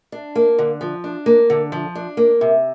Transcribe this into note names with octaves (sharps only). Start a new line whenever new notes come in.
D4
A#3
D3
F3
D4
A#3
D3
F3
D4
A#3
C3